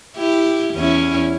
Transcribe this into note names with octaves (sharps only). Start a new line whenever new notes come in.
E4 G4
E2 C#4 E4